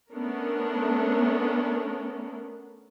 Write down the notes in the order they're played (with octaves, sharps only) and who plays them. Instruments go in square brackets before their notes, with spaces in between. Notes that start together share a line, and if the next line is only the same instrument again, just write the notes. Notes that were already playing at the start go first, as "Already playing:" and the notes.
[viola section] A3 B3 C#4 D4 A#4